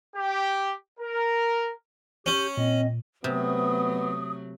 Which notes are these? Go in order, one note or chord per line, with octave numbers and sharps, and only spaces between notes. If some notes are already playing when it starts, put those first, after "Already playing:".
G4
A#4
C#4 G4 G6
A#2 C4 D#5
C3 F#3 A3 B3 D#6